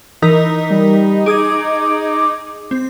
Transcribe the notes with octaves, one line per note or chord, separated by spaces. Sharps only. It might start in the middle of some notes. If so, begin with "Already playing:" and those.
E3 D#4 A#4 B6
G3
G#4 D6 D#6 G#6
C4